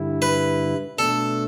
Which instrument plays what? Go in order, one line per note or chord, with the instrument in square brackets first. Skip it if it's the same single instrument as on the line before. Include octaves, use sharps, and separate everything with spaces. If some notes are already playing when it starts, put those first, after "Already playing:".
Already playing: [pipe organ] G2 D3 G3 E4
[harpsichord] B4
[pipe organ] B2 A3 D4 [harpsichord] A4